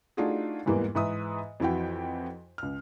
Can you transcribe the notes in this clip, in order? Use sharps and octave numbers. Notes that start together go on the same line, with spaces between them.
A3 D4 D#4 F4 F#4 G#4
E2 G#2 E3 G3 A#3
G#2 E3 B4 E5 D#6
F2 E3 E4 F#4 G5
C#2 F6